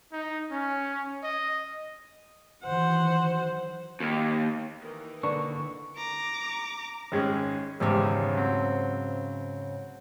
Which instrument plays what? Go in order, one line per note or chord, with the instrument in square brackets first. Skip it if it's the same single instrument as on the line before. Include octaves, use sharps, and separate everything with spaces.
[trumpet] D#4
C#4
D#5
[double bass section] D#3 E3 F#3 [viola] C5 F#5
[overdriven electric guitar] D#2
[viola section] D#3 E3
[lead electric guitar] D3 A#3 [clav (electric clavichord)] D4 B4 [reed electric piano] C#6
[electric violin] A#5 D6
[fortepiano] G#1 G#3 C#4
[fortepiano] G#1 E2 G4 [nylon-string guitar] G#2 C#3
[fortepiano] F#3 C4